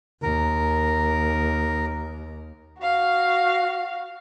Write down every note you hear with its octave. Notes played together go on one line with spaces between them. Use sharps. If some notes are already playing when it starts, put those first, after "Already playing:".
D#2 A#4
F#4 F5